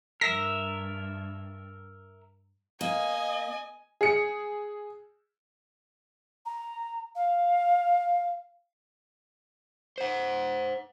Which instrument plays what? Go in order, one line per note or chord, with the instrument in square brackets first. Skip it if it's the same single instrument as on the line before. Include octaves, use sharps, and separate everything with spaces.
[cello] G2 [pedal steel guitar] A#4 E5 [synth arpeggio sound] A#6
[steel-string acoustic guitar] A#3 [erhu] D#5 [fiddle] G#5
[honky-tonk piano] G#4 C#7
[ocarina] A#5
F5
[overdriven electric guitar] C5 F#5